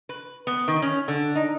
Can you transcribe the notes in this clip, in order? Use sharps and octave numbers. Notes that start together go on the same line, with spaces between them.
B4
B3
D#3
C#4
D3
D#4